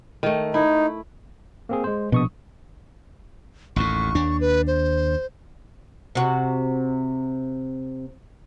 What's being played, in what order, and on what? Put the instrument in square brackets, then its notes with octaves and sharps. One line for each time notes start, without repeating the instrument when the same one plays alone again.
[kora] D#3 A3
[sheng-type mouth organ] D#4 [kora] E4
[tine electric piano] A#3 C4 G#4
G#3 C5
[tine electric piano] A#1 C#6 D#6 [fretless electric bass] B2
[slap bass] A1 D#2 A2 [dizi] C#6
[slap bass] D#2 D4
[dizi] B4
C5
[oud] C3 F#4